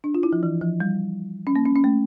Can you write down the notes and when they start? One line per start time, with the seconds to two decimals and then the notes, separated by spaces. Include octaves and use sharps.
0.04 D4
0.15 F4
0.23 E4
0.33 F3
0.43 E3
0.61 F3
0.80 G3
1.47 C#4
1.56 A#3
1.65 C#4
1.76 C#4
1.84 A3